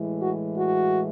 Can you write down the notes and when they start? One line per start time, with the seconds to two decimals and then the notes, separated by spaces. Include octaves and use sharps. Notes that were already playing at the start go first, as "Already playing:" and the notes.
Already playing: A2 E3 G#3
0.20 F#4
0.57 F#4